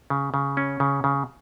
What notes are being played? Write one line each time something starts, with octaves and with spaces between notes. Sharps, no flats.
C#3
C#3
C#4
C#3
C#3